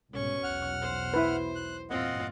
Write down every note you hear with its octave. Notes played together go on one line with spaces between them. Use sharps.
C2 G#2 B2 C#4 C#6
B1 E2 F#5 F6
C5
E4 B4
F#6
E2 G2 A#2 C4 F4 D#5 F#5